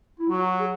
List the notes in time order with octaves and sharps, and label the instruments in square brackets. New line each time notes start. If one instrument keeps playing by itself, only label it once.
[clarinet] E4
[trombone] F#3 [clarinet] F#4
[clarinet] F#4
G#4